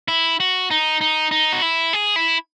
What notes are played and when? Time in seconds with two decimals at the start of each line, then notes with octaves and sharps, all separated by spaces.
0.08 E4
0.40 F#4
0.71 D#4
1.01 D#4
1.31 D#4
1.53 F#4
1.62 E4
1.93 G#4
2.16 E4